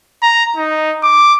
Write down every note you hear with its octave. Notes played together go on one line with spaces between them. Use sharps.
A#5
D#4
D6